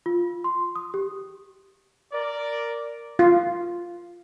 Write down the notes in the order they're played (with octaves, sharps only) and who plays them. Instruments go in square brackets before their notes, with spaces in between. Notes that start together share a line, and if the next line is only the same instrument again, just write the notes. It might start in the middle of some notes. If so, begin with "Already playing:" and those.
[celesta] F4
C6
D#6
G4
[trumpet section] A#4 D5
[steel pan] F4